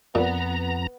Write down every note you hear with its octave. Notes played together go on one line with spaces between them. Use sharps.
F2 A#2 B3 A#5